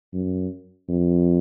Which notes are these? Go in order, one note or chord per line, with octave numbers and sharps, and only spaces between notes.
F#2
F2